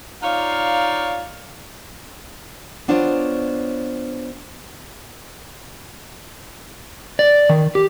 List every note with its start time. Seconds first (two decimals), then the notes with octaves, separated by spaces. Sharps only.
0.23 D#4 F4 C#5 D5 F5
2.88 B3 D4 F4 C5 C#5
7.19 D5
7.49 D#3
7.75 G4